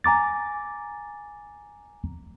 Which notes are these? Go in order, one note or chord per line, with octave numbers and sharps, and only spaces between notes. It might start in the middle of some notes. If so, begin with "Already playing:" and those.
G#5 A#5 D6 A6